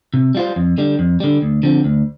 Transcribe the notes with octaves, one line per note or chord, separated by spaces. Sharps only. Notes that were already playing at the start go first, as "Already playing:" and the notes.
C3
G3 F4 C5
F2
D3 G3
F2
D3 G3
D2
D3 F3 C4
D2